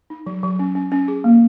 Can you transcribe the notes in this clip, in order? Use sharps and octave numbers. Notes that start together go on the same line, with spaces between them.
D#4
F#3
F#3
C#4
C#4
C#4
G#4
A#3